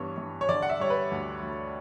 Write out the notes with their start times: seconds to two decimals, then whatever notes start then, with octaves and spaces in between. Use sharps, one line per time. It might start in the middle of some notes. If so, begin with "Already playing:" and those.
Already playing: G2 E3 B3 C#5
0.18 G2
0.41 C#5
0.49 D3 D5
0.62 F#5
0.70 E5
0.80 G3 C#5
0.90 B4
1.11 D2
1.43 D2